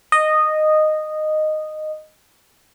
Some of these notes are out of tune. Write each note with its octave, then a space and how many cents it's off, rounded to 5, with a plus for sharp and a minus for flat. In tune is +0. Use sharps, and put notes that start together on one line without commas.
D#5 -10